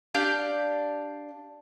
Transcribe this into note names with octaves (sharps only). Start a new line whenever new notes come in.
D4 G4 F5 G6